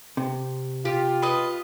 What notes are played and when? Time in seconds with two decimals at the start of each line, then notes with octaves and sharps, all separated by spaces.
0.17 C3
0.85 F4 G4
1.22 B4 D#5